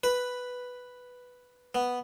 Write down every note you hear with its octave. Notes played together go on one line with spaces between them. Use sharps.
B4
B3